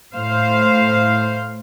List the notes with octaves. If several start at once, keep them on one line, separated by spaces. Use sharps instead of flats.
A2 C5 F5